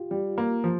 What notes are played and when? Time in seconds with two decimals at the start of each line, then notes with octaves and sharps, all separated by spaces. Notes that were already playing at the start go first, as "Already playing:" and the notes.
Already playing: F4 G4
0.11 G3
0.38 A#3
0.64 F3